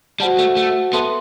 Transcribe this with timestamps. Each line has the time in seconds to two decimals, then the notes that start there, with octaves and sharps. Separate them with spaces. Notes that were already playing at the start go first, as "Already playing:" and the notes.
0.20 G3 F#4 C5 F#5 A5
0.39 A3
0.56 A3
0.93 B3 A4 E5 A5 C6